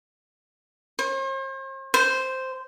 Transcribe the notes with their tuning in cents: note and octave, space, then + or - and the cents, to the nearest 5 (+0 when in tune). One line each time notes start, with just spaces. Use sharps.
C5 +45
C5 -5